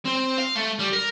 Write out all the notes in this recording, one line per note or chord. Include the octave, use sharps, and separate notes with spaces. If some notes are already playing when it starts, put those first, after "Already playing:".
C4
F5
A3
G3
A#4